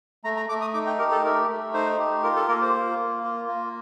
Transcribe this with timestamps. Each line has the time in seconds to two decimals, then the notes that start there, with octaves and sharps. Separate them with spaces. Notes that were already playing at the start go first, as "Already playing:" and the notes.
0.24 A3 A#5
0.37 A#5
0.49 A3 D6
0.61 D#6
0.74 D#4 D6
0.87 G5
0.99 G4 A#4
1.12 A4
1.24 A3 A#4
1.49 A3
1.74 D#4 C5
1.99 G4
2.23 F4 A#4
2.36 A4
2.48 A#3 A#4
2.61 C5
2.74 F4
2.99 A#3
3.23 F4
3.48 A#3